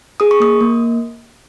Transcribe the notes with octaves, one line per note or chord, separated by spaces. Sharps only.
G#4 D#6
C#6
A#3 D#6
A#3